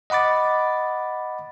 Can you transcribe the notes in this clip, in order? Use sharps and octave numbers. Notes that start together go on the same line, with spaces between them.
D#5 F#5 B5 D6 A6